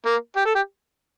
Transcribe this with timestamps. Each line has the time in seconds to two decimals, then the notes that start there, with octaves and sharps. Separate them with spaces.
0.06 A#3
0.36 G4
0.46 A4
0.55 G4